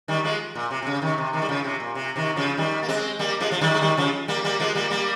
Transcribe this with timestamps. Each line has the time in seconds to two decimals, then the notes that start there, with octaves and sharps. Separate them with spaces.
0.08 D#3 G3
0.24 F3 G#3
0.55 A#2
0.71 C3
0.82 C3
0.87 C#3
1.02 C3 D#3
1.18 C3
1.33 C3 D#3
1.42 G3
1.49 C#3 F3
1.64 C3
1.80 A#2
1.95 C3
2.16 C3 D#3
2.36 C#3 F3
2.57 D#3 G3
2.83 A#3
2.88 G#3 C4
3.19 G3 A#3
3.41 F3 G#3
3.52 F3
3.61 D#3 G3
3.74 G#3
3.81 D#3 G3
3.97 C#3 F3
4.28 G3 A#3
4.44 G3 A#3
4.60 F3 G#3
4.75 G3 A#3
4.90 G3 A#3